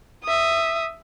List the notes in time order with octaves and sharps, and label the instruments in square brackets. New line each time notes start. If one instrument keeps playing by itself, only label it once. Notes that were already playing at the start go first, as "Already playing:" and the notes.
[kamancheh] E5 D#6